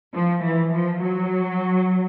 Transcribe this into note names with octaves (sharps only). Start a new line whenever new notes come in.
F3
E3
F3
F#3